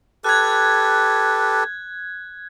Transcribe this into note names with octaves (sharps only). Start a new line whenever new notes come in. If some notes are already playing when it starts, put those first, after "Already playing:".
G4 A4 B4 F#6 G#6